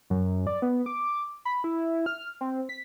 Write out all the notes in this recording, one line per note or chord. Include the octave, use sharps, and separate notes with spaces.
F#2
D5
B3
D6
B5
E4
F6
C4
B6